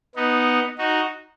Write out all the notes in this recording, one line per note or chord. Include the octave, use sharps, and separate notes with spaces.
B3 D#4
D#4 F#4